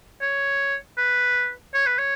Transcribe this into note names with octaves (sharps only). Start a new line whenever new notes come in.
C#5
B4
C#5
B4
C#5